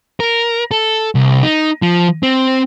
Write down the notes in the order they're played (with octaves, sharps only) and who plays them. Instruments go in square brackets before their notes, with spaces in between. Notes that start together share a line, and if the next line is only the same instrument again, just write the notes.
[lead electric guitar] A#4
A4
C2
D#4
F3
C4